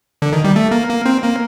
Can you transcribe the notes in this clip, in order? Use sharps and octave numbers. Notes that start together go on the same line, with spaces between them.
D3
D#3
G3
A3
A#3
A#3
C4
A#3